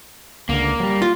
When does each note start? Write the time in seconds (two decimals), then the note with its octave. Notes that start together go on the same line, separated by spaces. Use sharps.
0.49 C#2 D3 A#3
0.80 F#3 G3
1.02 F4